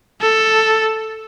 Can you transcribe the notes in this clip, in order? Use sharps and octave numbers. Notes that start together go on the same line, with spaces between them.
A4